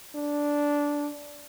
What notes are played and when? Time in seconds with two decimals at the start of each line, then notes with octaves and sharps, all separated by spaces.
0.15 D4